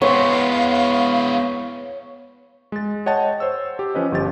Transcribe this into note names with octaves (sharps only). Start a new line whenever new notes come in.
G#3 B3 E4 C#5 F5 C6
G#3 A6
C#5 D#5 F#5 G5 A5 A6
C5 C#5 E6
G4
F3 C#4 B4 D#5
G1 F3 G4 A6